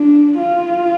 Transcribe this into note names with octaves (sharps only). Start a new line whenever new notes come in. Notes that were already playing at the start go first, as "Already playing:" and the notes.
Already playing: D4
F4